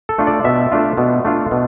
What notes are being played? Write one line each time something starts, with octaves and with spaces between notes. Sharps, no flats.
A4
A3 D4 F4
D5
B2 E5
A3 D4 F4
B2
A3 D4 F4
B2